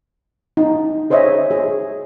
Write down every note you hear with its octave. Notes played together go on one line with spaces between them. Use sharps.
D#4
G#4 C5 C#5 D#5 E5
G#4